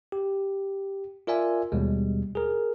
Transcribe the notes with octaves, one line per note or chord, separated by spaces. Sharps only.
G4
F4 A#4 D5 E5 G#5
D#2 B2 G3 G#3
G#4 A#4